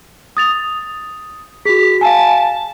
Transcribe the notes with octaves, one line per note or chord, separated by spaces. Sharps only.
D#6 A6 F7
F#4 G#4 B6
F5 G#5 A5